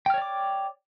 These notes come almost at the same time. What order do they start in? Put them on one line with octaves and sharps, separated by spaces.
G5 F6 C#5 D5 D6